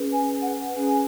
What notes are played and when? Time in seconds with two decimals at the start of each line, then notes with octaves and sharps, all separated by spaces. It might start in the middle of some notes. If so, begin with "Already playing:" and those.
Already playing: C#4 G#4 B4
0.12 G#5
0.42 F#5
0.70 C#4 G#4 B4 G#5